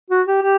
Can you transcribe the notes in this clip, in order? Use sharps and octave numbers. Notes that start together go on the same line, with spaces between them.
F#4
G4
G4